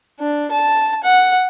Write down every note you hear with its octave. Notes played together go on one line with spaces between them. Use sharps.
D4
A5
F#5